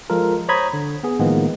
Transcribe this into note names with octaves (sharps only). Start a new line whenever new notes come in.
F3 G#3 F4 A4 A#4
C5 C#5 A#5 B5 D#6 G#6
D3
B3 G#4
A2 D#3 F3 G#3 A#3 B3